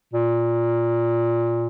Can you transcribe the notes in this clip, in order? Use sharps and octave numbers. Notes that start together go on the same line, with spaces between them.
A#2